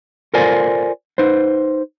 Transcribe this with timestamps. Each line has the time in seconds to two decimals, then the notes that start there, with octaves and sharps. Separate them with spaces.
0.34 F4 A4 A#4 C5 D5 G#5
1.18 D#4 B4 C5